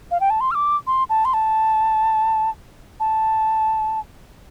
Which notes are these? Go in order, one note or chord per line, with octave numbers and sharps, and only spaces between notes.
F5
G5
A5
C6
F6
D6
C6
A5
C6
A5
A5